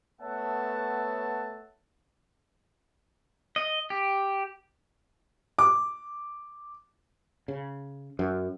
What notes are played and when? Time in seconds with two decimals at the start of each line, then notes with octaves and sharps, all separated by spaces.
0.22 A3 B3 C#5 E5 F#5 A5
3.56 D#5
3.90 G4
5.59 D6
7.48 C#3
8.19 F#2